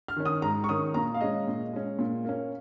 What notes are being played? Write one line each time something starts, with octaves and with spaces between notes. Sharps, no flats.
F6
D#3 C#4
D#6
G#2 A#5
C#6
D#3 C#4 D#6
A#2 A#5
F5
G#3 C#4 D#5
A#2
G#3 C#4
A#2
A#3 C#4